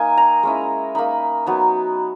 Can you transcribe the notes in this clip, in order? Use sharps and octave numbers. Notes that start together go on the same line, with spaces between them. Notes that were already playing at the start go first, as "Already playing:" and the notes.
Already playing: A#3 D#4 G#5
A#5
G#3 C#4 E4
A#3 D#4 B5
F#3 B3 D#4